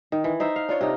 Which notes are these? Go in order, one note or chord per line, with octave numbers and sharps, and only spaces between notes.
D#3
E3
D#4 C5 E5
F5
D4 F4 C#5
C3 D#4